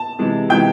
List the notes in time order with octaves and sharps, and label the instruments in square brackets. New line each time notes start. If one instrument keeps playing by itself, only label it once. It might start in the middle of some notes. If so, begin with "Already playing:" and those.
Already playing: [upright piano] A5
C3 E3 G#3
C3 E3 G#3 G5 G6